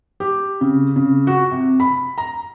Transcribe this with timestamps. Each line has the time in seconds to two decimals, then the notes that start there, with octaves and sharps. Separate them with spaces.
0.20 G4
0.61 C#3
0.96 C#3
1.27 F#4
1.51 C3
1.80 B5
2.18 A#5